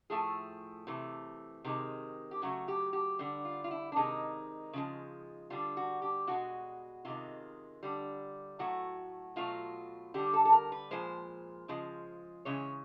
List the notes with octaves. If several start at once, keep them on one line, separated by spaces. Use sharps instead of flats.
A2 F3 A3 G#4
C3 E3 A3
C3 D#3 G#3
G4
C#3 F#3 A3 F#4
G4
G4
D3 G3
F4
F4
E4
D4
C3 D#3 G#3 D#4
C#3 F3 G#3
D3 G3 F4
F#4
G4
B2 G#3 F#4
C3 D#3 G#3 F4
D3 G3
A2 F#3 A3 F#4
B2 F#3 A3 F4
D3 G3 G4
A4
A4
A#4
B4
A#2 F3 G#3 C5
C#3 F3 G#3
C#3 E3 G#3 C#5